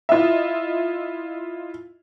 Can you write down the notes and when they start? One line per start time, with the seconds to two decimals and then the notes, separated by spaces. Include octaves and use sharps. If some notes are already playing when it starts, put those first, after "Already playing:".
0.09 E4 F4 D#5 E5